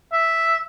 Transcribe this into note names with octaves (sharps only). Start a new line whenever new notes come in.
E5